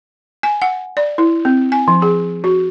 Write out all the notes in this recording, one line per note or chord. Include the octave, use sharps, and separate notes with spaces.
G#5
F#5
D5
E4
C4
G#5
F3
G#4
F#4